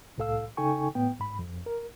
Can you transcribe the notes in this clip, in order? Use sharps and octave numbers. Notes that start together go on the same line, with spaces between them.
C2 A2 A4 F5 E6
C#3 D#4 A4 G5 G#5 C#6
A2 B3 G5
G#2 B5
F2
A#4